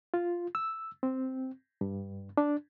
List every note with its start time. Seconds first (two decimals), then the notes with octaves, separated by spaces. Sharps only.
0.14 F4
0.55 E6
1.03 C4
1.81 G2
2.37 D4